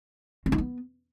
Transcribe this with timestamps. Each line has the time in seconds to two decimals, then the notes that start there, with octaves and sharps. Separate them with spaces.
0.46 C4
0.52 D#4
0.58 B3